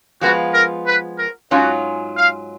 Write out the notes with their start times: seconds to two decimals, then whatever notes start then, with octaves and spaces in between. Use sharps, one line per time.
0.21 F3 G#3 B3 F4 F#4
0.53 A#4
0.87 B4
1.18 A#4
1.51 G#2 F#3 C#4 F4 F#4
2.17 F5